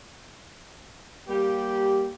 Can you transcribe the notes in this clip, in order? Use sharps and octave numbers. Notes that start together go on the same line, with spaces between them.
G3 A#3 G4